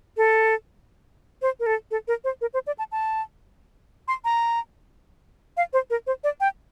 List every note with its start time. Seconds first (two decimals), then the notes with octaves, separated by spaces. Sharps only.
0.17 A4
1.42 C5
1.60 A#4
1.66 A4
1.91 A4
2.08 A#4
2.24 C5
2.41 A#4
2.54 C5
2.67 D5
2.78 A5
2.92 A5
4.08 C6
4.25 A#5
5.57 F5
5.73 C5
5.90 A#4
6.07 C5
6.24 D5
6.40 G5